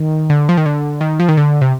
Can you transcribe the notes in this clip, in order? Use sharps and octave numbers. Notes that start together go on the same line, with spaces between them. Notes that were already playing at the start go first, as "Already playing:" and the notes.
Already playing: D#3
D3
F3
D#3
D3
D#3
F3
D#3
D3
C3